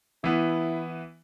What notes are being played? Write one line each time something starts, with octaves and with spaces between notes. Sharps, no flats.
E3 B3 E4